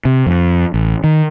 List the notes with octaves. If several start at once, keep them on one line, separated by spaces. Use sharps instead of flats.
C3
F2
A1
D#3